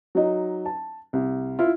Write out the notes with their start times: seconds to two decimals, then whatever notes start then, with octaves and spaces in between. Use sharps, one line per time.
0.15 F#3 D#4
0.66 A5
1.13 C2
1.59 E4 F4